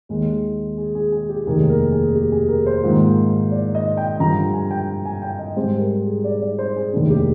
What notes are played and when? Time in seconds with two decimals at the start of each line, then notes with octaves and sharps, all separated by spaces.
0.09 D#2 D#3 G#3
0.78 G#4
0.95 G#4
1.12 G#4
1.29 G4
1.47 F1 D#2 D#3 A#3 G#4
1.69 A#4
1.92 G#4
2.15 G4
2.32 G#4
2.48 A#4
2.66 C5
2.83 G#2 D#3 A#3 F4
3.51 D5
3.75 D#5
3.97 G5
4.19 G2 D3 F3 A#5
4.53 G#5
4.71 G5
5.05 G#5
5.22 G5
5.39 D#5
5.56 G#2 G3 C4 C5
5.79 A#4
6.02 G#4
6.24 D5
6.41 D5
6.59 C5
6.76 G#4
6.93 F1 D#2 D#3 A#3 D4 G#4
7.10 G4